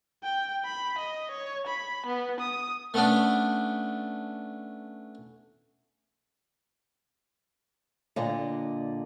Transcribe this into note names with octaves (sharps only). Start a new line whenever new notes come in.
G5
B5
D#5
C#5
B5
B3
D#6
A3 B3 C#4 D4
A#2 D3 D#5